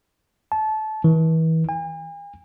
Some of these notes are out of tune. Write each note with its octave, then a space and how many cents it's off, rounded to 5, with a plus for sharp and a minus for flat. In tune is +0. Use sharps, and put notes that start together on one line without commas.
A5 -25
E3 -35
G#5 -45